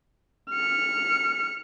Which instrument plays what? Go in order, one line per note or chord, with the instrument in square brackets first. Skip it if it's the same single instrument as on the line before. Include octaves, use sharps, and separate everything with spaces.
[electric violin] F6 C#7